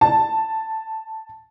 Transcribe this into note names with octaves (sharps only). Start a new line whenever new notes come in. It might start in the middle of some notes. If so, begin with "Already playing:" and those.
A5